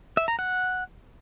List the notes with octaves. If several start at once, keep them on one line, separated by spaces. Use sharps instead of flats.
E5
A#5
F#5